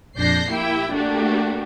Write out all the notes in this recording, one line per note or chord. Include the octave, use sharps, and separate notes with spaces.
A#1 F2 D4 G6 A#6 C7
A#3 E4 G4 G5
A3 A#3 D4 F#4 G4